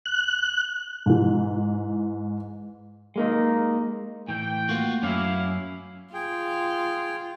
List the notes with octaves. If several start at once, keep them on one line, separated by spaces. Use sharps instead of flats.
F#6
G#2 E3
G#3 A#3 D#4
A2 E3 G5
A3 A#3 F4 F#4
F#2 F#3 C#4 E4 F5 D6
F4 G#4 G5